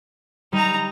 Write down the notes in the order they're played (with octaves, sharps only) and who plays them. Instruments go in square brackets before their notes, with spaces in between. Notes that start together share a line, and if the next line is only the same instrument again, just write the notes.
[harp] G3 [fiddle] D#4 A#5